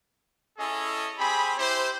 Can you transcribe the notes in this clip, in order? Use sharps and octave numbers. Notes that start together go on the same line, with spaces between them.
C#4 E4 G#4 A4 D#5
C4 G4 G#4 B5
E4 G4 C5